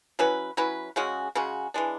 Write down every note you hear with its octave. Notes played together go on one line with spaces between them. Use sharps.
F#3 C#4 E4 B4
F#3 C#4 E4 B4
C#3 G#3 C#4 F#4
C#3 G#3 C#4 F#4
E3 G#3 D4